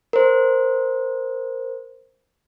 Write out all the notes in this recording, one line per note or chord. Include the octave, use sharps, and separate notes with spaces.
A#4 C5